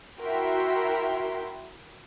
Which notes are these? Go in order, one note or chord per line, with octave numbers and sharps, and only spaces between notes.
E4 F#4 A#4 E5 G5 C6